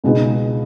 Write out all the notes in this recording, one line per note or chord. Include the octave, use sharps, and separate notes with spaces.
C#2 B2 G#3 B3 D#4